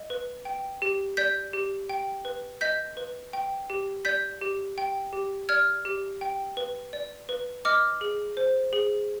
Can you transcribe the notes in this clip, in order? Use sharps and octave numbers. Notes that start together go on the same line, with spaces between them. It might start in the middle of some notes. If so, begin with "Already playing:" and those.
Already playing: D#5
B4
G5
G4
D5 G6 B6
G4
G5
B4
D#5 G6 B6
B4
G5
G4
D5 G6 B6
G4
G5
G4
D5 F6 G#6
G4
G5
B4
D5
B4
D#5 D6 F6
G#4
C5
G#4